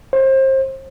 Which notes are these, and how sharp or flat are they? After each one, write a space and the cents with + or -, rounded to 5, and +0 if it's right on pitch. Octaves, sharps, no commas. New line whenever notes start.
C5 +30